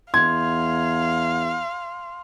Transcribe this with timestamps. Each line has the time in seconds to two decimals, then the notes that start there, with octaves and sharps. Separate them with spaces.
0.14 E2 F5 C6 G#6